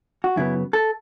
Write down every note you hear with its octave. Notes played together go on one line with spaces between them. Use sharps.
F#4
F#2 C#3 F#3 B3 E4
A4